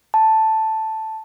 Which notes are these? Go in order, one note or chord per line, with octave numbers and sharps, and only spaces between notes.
A5